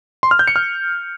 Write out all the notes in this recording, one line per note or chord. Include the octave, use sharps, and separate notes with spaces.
C6
F6
G6
C#7
F6